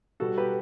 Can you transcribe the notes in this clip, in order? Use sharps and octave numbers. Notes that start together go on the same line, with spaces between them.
B2 G3 F#4 A4
G4 B4